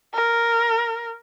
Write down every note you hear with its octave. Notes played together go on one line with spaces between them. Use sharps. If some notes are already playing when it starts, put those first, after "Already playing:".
A#4